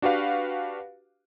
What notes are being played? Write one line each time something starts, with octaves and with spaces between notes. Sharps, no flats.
D4 F#4 G4 B4 F5